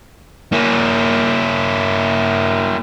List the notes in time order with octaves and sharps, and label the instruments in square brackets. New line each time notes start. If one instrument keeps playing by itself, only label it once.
[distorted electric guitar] A#3 E4